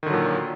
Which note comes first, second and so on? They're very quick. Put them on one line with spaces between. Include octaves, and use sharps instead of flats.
D#3 D3 F#3 A#2